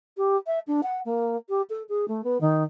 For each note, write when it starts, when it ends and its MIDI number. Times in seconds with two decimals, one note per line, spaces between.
0.17 0.37 67
0.47 0.59 76
0.67 0.81 62
0.83 1.00 78
1.05 1.37 58
1.49 1.62 67
1.70 1.83 69
1.89 2.08 68
2.08 2.24 57
2.24 2.40 59
2.41 2.63 51